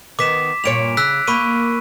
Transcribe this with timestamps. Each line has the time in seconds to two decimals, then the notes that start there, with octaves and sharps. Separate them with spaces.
0.19 D#3 B3 D6 B6 E7
0.64 G2 A#2 C#5 D7 F7
0.97 C#3 E6 F#6 B6
1.27 A#3 B5 C#6 D#7